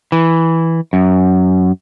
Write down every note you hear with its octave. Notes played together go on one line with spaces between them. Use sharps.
E3
F#2